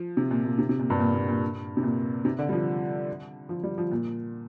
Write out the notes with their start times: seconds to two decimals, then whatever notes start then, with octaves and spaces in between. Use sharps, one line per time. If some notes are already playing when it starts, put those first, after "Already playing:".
Already playing: F3
0.17 C3
0.31 A#2
0.45 A#2
0.59 C3
0.69 C3
0.79 A#2
0.90 G2
1.00 A#2
1.14 A#2
1.28 A#2
1.77 C3
1.83 A#2
2.25 C3
2.39 D3
2.49 G3
2.53 F3
3.49 F3
3.64 G3
3.78 F3
3.92 A#2